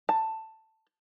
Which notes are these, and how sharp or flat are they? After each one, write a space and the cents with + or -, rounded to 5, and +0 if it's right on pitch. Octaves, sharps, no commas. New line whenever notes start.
A5 +10